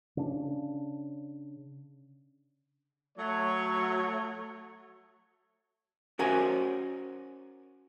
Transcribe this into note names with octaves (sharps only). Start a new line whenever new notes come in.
C#3 D4
F#3 A3 C#5
C#4 F#4 A#4 C5 G#5